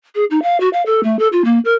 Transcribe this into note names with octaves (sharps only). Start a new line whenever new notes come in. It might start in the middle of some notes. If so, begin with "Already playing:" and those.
G#4
D#4
F5
F#4
F5
A4
A3
A4
F4
A#3
A#4